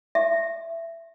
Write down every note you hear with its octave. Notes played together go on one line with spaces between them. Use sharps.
E5